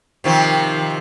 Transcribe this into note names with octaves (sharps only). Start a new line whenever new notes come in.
C3 D#3 F3